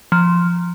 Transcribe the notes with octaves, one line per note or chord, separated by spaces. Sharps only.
F3